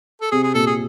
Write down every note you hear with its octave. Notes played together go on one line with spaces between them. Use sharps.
A4
C3 G#4
G#4
A#2 A4
G#4